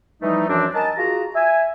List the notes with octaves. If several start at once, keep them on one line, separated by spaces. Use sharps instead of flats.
E3 F3 G3 A3 D#4
F#2 E3 F3 C4 D4
A#4 D#5 G#5 A5
F4 F#4 G#4 A#5
E5 G#5